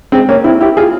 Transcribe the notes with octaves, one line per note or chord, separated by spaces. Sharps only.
G#3 C4
A#3 C#4
C4 E4
E4 G4
F4 G#4